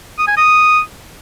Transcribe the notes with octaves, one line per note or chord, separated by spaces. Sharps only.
D#6
G#5
D#6